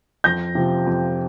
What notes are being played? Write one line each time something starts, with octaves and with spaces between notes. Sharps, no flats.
F2 G6 A#6
C3 F3
F2